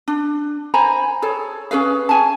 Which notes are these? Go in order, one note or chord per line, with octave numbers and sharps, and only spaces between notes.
D4
C5 G#5 A#5 B5
G#4 A4 C#5
C#4 G#4 B4 F5
C#4 G#5 A5